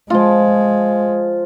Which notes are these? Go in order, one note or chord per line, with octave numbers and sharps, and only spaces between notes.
F3 G#3 F4